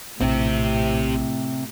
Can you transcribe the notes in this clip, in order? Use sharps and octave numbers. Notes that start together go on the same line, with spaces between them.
A#1 A2 C3 C4 G4